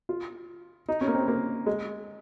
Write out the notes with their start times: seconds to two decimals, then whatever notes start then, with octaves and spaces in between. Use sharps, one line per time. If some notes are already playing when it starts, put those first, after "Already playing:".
0.09 F4
0.88 D#4
1.01 C#4
1.08 A#3
1.15 C4
1.28 A#3
1.66 G#3